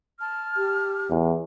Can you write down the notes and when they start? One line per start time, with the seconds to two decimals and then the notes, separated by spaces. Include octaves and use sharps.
0.20 A5 F6
0.57 G4
1.10 E2